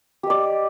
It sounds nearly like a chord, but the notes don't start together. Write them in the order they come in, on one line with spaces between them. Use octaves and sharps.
G4 D#5 D5